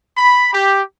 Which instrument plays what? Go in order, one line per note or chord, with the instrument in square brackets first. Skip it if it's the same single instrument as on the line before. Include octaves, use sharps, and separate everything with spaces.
[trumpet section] B5
G4